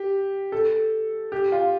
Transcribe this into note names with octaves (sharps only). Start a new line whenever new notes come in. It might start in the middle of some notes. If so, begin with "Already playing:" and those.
Already playing: G4
A4
G4
F4